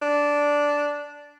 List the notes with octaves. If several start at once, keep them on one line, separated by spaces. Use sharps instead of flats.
D4